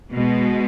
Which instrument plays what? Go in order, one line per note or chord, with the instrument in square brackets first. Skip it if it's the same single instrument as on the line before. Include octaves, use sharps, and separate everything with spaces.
[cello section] B2 G#3